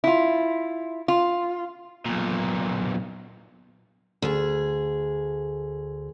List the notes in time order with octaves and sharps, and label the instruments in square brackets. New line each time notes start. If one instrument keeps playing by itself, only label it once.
[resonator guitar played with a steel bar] E4 F4
F4
[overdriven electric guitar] B1 A#2
[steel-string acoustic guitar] D2 G#4